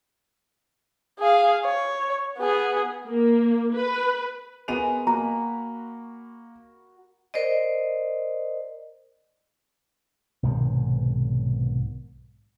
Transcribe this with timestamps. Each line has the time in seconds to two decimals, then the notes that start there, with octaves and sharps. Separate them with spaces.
1.20 G#4 F5
1.65 C#5
2.38 B3 G#4
3.08 A#3
3.75 B4
4.68 G#3 B3 F#4 A#4 D#7 F7
5.07 A#3 F#4 A#5 B5
7.34 A#4 C5 D5 D#5
10.43 B1 G#2 C3 D#3